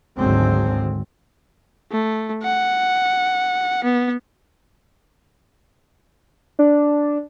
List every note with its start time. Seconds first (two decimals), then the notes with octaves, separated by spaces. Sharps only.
0.17 G#1 D2 D3 F#3 G#3 C4
1.92 A3
2.43 F#5
3.84 B3
6.59 D4